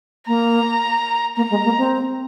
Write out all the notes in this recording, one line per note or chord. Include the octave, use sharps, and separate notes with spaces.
A#3 A#5
A#3 A#5
G#3
A#3
C4